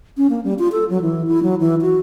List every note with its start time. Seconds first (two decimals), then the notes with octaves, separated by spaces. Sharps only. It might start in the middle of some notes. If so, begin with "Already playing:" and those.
0.17 C#4
0.30 A#3
0.44 G3
0.59 F4
0.72 A4
0.90 F#3
1.02 E3
1.27 E4
1.43 F#3
1.60 E3
1.82 F#4